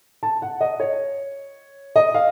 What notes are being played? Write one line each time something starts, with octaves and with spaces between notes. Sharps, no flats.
A5
F#5
D#5
C#5
D#5
F5